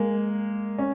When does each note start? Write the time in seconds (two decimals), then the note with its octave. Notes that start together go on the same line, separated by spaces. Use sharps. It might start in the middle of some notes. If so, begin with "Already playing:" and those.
Already playing: G#3 A#3
0.78 C#4